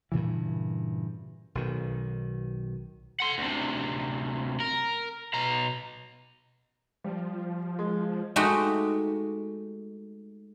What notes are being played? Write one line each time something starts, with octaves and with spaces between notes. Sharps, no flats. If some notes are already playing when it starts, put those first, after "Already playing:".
G2 A#2 C#3 E3
B1 D#3
F#5 C6
D2 C3
A#4
B2 A#5
F3 G3
G#3
G#3 A3 D#4 F#4 G4